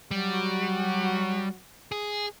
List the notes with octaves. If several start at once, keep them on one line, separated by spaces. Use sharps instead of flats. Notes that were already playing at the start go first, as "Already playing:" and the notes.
F#3 G3 F#4
G#4